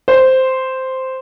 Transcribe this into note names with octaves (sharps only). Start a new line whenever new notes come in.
C5